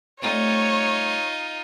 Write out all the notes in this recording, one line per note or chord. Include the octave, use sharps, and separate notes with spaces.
G3 A3 C4 D#4 F4 C#5